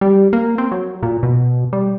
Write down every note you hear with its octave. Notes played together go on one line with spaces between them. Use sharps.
G3
A#3
C4
F#3
A#2
B2
G3